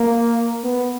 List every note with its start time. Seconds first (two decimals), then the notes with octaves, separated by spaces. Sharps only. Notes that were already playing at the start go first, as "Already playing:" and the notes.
Already playing: A#3
0.64 B3